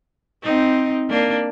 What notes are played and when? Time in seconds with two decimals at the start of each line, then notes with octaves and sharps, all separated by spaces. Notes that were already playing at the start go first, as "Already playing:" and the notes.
0.43 C4 D#4
1.10 A#3 D4